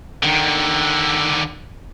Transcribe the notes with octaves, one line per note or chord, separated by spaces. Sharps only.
D3 D#3